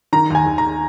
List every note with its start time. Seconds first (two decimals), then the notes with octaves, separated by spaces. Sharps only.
0.13 D#3 A#5
0.30 D#2 G#5
0.47 D#2
0.58 A#5